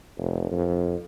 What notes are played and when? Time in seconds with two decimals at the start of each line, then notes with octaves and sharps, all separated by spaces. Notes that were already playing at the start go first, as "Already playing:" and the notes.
0.18 F1
0.52 F2